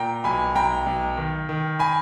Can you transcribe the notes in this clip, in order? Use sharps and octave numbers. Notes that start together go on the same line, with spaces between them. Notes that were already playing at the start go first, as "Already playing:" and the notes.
Already playing: A#2 G5 A#5
B1 G#5 B5
B1 G5 A#5
B1
D#3
D#3
G#5 B5